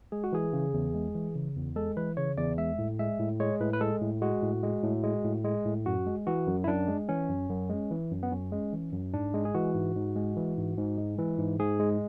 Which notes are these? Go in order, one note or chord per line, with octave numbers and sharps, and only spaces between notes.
G#3 G#4
F#4
E3 G#4
C#3
E2
G#3
E3
C#3
E2
G#3 A4
E3 B4
C#3 C#5
E2 D5
G#3 E5
A2
G#3 E5
A2
G#3 C#5
A2 B4
B4
G#3 A4
A2
G#3 F#4
A2
G#3
A2
G#3
A2
G#3
A2
F#2 F#4
G#3
E3 F#4
F#2
E4
F#2 D4
G#3
E3 C#4
F#2
F#2
G#3
E3
F#2
B3
F#2 C#4
G#3
E3
F#2
G#2 D4
G#3
G#4
E3 F#4
G#2
G#2
G#3
E3
G#2
G#2
G#3
E3
G#2
G#2 G#4
G#3